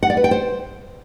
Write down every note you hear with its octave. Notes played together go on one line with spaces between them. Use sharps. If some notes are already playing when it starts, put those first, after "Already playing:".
F#5
D5
B4
G5
C5